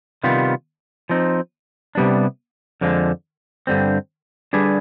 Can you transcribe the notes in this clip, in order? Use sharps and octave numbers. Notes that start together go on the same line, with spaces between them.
C3 D#3 G3 B3 F4
F3 C4 D#4
C3 G3 B3 D4
F2 D3 F3 G#3
G2 D3 G3 C4
D3 G3 D4 G#4 B4